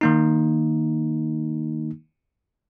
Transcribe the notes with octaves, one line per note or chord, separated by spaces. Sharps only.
D#3 A#3 D#4